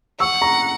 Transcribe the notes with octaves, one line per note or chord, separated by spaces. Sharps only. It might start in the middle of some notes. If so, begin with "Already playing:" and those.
F#5 C#6 E6
A#5 C#6